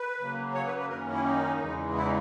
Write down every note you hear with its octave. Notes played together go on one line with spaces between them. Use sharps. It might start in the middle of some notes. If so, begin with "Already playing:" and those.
Already playing: B4
C#3 F#3 A#3
C#5
B4
B4
F#2 D#3 A#3 C#4 A#4
E4
D#4
E2 C#3 E3 G#3
E4
D#4